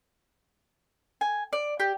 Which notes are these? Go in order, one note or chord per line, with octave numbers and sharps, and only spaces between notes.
G#5
D5
G4